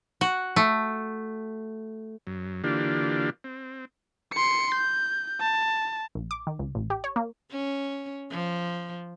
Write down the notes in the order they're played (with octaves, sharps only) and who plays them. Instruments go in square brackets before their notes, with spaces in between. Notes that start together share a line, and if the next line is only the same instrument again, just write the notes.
[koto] F#4
A3
[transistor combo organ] F#2
D3 E3 A#3 D4 F4 G4
C4
[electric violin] C6 C#7
G6
A5
[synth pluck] A#1
D6
D#3
C#2
A1
G4
C#5
A#3
[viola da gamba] C#4
F3